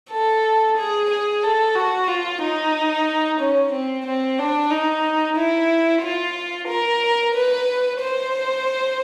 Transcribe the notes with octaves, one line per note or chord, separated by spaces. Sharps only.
A4
G#4
G#4
A4
F#4
F4
D#4
C#4
C4
C4
D4
D#4
E4
F4
A#4
B4
C5